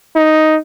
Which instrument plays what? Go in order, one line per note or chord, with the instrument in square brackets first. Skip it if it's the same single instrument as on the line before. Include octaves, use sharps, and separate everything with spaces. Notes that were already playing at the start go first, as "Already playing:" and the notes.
[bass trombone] D#4